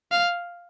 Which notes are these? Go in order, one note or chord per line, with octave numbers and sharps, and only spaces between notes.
F5